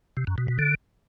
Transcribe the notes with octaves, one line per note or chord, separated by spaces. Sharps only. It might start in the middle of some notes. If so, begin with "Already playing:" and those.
C3
F#2
B2
B2
D3